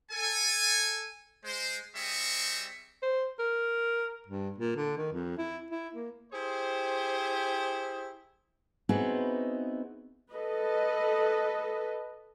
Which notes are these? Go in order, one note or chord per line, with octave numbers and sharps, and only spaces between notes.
A4 G#5
G#3 C5
G3 C4 G#4 D#5 E5 C#6
C5
A#4
G2
A#2
D3
D#3
F2
E4
E4
A#3
E4 G4 G#4 C5
B3 C4 D#4 E4 F#4 G#4
A4 B4 D#5